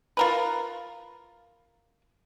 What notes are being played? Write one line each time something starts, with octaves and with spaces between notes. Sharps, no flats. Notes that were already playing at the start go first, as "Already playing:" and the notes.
F4 A#4 B4